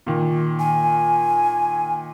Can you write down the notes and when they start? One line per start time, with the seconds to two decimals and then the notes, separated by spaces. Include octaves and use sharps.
0.07 A#2 D#3
0.59 G#5